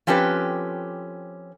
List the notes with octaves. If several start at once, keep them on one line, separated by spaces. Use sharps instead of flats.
F3 C4 C#4 G4 A4 B4